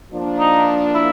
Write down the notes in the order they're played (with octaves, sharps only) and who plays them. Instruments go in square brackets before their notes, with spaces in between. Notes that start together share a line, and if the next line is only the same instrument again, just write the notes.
[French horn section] F3 A#3 D4
[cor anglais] D#4
E4